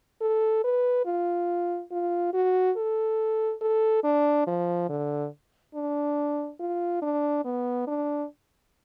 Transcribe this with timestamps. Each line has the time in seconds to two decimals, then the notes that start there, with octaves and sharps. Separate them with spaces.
0.21 A4
0.64 B4
1.06 F4
1.92 F4
2.34 F#4
2.77 A4
3.61 A4
4.04 D4
4.47 F3
4.89 D3
5.75 D4
6.60 F4
7.02 D4
7.45 B3
7.87 D4